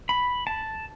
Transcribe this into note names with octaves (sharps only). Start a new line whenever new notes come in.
B5
A5